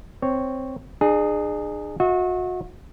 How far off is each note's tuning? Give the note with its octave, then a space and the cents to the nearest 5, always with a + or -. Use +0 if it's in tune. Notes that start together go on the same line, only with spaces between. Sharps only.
C4 +0 C#5 +0
D4 +45 G#4 +0
F#4 -30 E5 -45